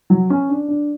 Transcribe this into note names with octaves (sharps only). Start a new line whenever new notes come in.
F#3
C#4
D4
D4